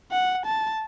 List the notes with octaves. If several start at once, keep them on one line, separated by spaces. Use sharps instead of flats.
F#5
A5